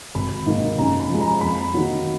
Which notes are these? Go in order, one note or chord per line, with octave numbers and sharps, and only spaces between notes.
G#1 B5
G#2 D#3 A#3
F#2 A#5
B5
F3 G#3
A#5
F2 B5
D#3 F#3 A#3